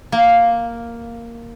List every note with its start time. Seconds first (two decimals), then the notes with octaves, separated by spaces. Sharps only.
0.12 A#3